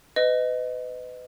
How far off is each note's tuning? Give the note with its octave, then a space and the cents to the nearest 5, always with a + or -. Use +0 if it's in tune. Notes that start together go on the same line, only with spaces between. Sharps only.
B4 +30 D#5 +0